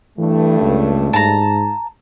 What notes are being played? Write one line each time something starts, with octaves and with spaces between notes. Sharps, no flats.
G2 E3 A3
C#2
G#2 A5 A#5